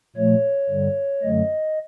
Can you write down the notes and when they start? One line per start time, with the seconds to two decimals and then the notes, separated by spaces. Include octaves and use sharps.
0.16 A#2 F3 A3 C#5
0.69 G2 D3 G3
1.23 F#2 D3 F#3 A3 D#5